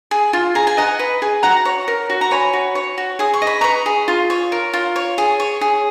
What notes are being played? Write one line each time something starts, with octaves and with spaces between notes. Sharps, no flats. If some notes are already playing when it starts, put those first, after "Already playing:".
G#4
F4
G#4 A#5
G#5
D#5 F#5 A#5
B4
G#4
F#4 F#5 A#5
C#5
A#4
F#4
A#5
C#5 G#5 B5
F#4
C#5
F#4
G#4 D#6
C#6
D#5
B5
B4 A#5 C#6
G#4
F4
C#5
A#4
F4
C#5
G#4
C#5
G#4